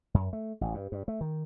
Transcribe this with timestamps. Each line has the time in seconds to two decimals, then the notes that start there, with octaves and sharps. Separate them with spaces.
0.14 F#2
0.33 A3
0.61 A1
0.74 G2
0.92 G2
1.08 A3
1.21 D#3